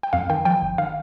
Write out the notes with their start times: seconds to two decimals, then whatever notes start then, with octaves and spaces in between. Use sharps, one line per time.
0.03 G5
0.13 F2 F5
0.30 D#3 G5
0.45 F3 G5
0.62 G1
0.78 D#3 F5